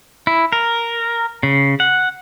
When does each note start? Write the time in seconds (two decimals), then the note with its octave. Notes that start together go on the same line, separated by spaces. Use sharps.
0.27 E4
0.53 A#4
1.43 C#3
1.80 F#5